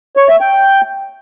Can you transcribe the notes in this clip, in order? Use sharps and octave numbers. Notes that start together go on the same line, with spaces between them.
C#5
E5
G5